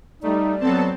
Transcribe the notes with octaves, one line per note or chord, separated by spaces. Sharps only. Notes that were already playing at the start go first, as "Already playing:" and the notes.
G3 A3 D#4 D5
F#3 B3 C4 A4 A5